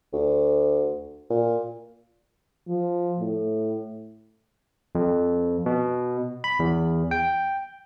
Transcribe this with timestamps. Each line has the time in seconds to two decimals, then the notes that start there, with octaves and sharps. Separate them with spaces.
0.13 D2
1.31 A#2
2.68 F3
3.19 A2
4.95 F2
5.66 B2
6.44 B5
6.59 E2
7.11 G5